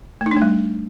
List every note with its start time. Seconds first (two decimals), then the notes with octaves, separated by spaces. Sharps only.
0.21 A3
0.26 D#4
0.31 D4
0.37 A3
0.42 G3